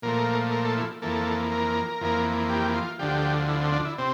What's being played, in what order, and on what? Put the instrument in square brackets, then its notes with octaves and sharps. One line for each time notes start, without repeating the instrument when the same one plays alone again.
[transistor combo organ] A#2 F3 A3 A#4
A#4
A4
E4
F2 E3 A#3 A4
A#4
F2 E3 A#3
G4
F4
D2 D3 F3 G4
E4
C4
D4
E4
C3 C4